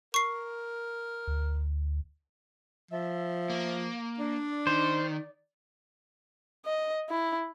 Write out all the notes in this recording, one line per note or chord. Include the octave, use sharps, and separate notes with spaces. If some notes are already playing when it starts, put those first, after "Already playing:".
A#4 C#6 C7
D2
F3 E5
A#3
D4 D5
D#3 C5
D#5
E4